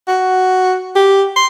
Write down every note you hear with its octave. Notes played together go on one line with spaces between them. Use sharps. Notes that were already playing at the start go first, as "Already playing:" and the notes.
F#4
G4
C6